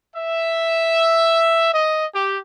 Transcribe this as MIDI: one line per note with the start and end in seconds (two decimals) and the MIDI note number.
0.14 1.69 76
1.73 2.04 75
2.12 2.39 67